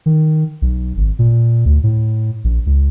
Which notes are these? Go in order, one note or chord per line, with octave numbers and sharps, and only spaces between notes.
D#3
B1
G#1
A#2
D2
A2
A#1
C#2